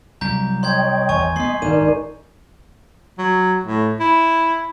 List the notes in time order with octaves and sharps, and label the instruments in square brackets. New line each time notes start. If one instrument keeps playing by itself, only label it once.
[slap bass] C2 [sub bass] F#3 [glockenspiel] A#5 G6
[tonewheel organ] C#5 D#5 G5 [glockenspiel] C6 G6 G#6
[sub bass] G#1 [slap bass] E2 [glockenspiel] G#5 C#6
[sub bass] C2 [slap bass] A3 B3 [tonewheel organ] D#5 [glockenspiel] C6 C7
[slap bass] G#1 G2 [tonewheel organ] D#4 A#4 D5 [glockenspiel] D#7
[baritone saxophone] F#3
A2
E4